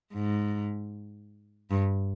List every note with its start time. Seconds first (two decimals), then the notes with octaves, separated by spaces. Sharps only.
0.14 G#2
1.71 G2